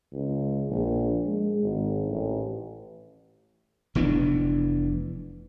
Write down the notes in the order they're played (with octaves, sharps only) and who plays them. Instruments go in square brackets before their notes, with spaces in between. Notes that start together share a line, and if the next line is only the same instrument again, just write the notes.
[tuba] C#2
A#1
G#3
G#1
A1
[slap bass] F1 E3 B3 D4